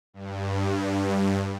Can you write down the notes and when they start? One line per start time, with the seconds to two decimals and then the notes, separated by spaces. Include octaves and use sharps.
0.14 G2